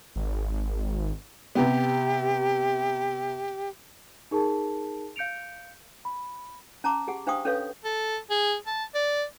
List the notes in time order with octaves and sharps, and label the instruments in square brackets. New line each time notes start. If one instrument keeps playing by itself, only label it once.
[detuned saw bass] G#1
[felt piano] C3 B3 [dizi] G4
[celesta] D#4 G#4 A#4 A5
F5 G6 C#7 D7 F7
B5
[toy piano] C#4 A5 A#5 D6
G4 G#4 F#5
D4 C5 F5 G5 C#6 D#6
C#4 A4 B4 C#5 F5 C#6
[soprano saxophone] A4
G#4
A5
D5